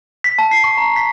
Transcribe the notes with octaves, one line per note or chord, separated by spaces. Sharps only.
B6
A5
C7
C#6
A#5
B6